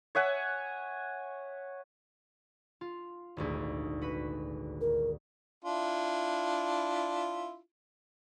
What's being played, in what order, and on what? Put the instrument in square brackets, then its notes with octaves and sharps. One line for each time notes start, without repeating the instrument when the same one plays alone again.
[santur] C#5 E5 F#5 G#5
[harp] F4
D#1 G#1 D2
F#4 B4 B5
[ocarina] A#4
[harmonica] D4 E4 F4